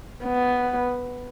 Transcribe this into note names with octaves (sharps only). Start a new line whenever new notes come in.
B3